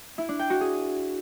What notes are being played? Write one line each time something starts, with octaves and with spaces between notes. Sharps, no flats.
E4
D4
G5
F#4
G#4